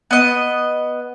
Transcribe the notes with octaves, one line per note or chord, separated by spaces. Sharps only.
B3 D#5